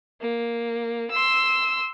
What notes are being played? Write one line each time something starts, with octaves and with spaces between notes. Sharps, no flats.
A#3
C6 E6